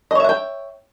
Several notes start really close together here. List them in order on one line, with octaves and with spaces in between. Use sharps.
D#5 C#5 E5 F#5 G5